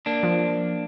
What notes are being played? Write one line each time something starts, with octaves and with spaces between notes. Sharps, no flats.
A#3 D4
F3